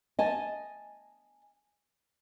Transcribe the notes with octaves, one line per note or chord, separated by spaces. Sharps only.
D#5 G#5 A5